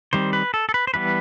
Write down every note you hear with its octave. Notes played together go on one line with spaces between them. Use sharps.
D#3 G3 C4 C5
B4
A4
A4
B4
C5
E3 G3 B3 B4